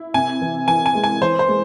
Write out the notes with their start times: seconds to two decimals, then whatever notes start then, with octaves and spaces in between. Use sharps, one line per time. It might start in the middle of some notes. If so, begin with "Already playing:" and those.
Already playing: E4
0.14 C3 G#5
0.41 E3
0.68 E3 G#5
0.86 G#5
0.95 G#3
1.04 G#5
1.21 E3 C5
1.39 C5
1.48 G#3